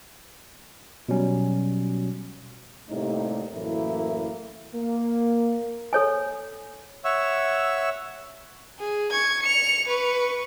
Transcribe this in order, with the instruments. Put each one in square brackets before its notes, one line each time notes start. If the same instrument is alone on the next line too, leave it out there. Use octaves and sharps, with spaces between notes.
[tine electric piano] B2 F#3 G3 C#4
[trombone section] A2 C3 G3 A3 A#3 D#4
F#2 A2 E3 A3 A#3 E4
A#3
[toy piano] A4 C#5 G#5
[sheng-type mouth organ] C#5 E5 F#5 C#6 E6
[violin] G#4
C#6 G#6
C#7 F7
B4 C#6